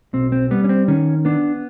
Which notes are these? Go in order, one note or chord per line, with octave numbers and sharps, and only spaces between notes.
B1 C4
C4
G3 B3
C#4
C4
D#3 C#4
B3 D4